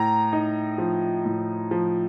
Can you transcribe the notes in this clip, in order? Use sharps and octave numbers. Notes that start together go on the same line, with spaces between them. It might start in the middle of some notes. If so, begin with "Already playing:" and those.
Already playing: A2 A#5
D#4
F3
A2
F3